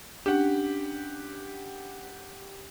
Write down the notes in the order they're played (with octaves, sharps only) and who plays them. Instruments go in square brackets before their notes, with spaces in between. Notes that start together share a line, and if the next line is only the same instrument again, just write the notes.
[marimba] C#4 D4 [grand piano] G4 F#5